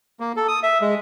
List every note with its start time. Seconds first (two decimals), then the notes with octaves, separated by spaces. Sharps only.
0.20 A#3
0.37 A4
0.48 D#6
0.63 E5
0.81 G#3